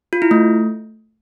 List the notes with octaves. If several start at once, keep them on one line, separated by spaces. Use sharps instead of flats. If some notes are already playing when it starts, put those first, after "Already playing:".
F4
E4
A3